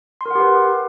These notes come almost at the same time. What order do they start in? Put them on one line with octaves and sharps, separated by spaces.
C6 A#4 F#5 G4 B4